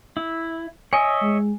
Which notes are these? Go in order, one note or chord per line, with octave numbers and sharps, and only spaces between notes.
E4
C#5 D#5 E5 G#5
G#3